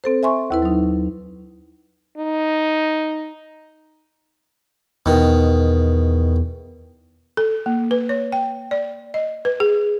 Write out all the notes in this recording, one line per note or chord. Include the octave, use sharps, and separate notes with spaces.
C4 A4 C5
E5 G#5 C6 C#6
D#2 E4 B4
F#3 D#4
D#4
E2 B2 D#3
A4
A#3
B4
C#5
G5
D5
D#5
B4
G#4